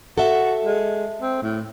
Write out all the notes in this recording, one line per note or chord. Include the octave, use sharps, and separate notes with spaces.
F#4 A4 E5
G#3
C4
A2